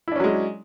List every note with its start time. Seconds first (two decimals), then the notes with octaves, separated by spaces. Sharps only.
0.08 E4
0.12 D4
0.16 C#4
0.20 F#3
0.24 G#3